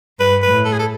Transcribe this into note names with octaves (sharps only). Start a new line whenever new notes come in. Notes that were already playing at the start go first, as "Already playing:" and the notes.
G2 B4
B4
A2
A4
G#4
A4